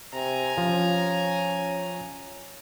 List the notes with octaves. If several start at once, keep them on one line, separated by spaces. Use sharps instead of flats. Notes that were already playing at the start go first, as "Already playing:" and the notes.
C3 G#5 A#5
F3 C#4